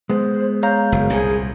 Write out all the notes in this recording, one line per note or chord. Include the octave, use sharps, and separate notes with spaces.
G#3 B3 C5
C#5 F5 A#5 G6
F#1
C2 A#2 G#4